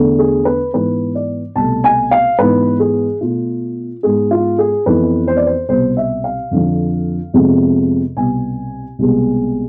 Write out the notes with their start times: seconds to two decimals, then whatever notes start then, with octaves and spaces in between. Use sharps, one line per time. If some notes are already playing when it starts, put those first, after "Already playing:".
Already playing: E2 D3 A3
0.19 G#4
0.45 B4
0.73 G#2 E3 B3 B4
1.15 D5
1.56 C2 B2 A3 A5
1.84 G#5
2.11 F5
2.38 G#2 E3 B3 B4
2.80 G#4
3.21 B2 A3 F4
4.03 G#2 G#3 B3 G#4
4.31 F4
4.58 G#4
4.86 F2 E3 B3 B4
5.27 C5
5.37 D5
5.46 C5
5.69 C2 B2 B3 C5
5.97 E5
6.24 F5
6.51 F2 D3 F3
7.34 F2 C3 F3 G#3 B3
8.17 C2 B2 B3 G#5
8.99 C2 B2 G#3 B3